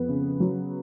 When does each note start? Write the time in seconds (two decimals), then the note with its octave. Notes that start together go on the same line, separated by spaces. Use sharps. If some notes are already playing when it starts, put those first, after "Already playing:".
Already playing: F2 B3
0.09 C#3
0.40 F#3